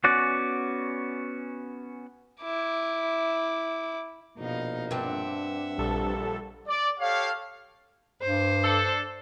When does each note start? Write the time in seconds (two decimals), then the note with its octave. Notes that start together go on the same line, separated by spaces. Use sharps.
0.04 B3 C#4 F#4 D5 F#6
2.42 E4 D6
4.38 A#1 B2 D#4 F5
4.91 G2 C4 E5 F#5
5.78 A#1 G3 A4
6.68 D5
7.00 G4 A4 C#5 F5
8.22 G2 C5
8.63 D4 A4